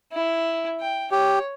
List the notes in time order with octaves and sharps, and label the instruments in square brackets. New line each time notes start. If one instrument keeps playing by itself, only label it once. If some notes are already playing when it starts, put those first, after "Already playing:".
[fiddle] E4
G5
[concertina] G4 [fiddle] C#5